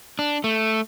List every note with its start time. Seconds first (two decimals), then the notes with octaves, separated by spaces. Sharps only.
0.19 D4
0.44 A3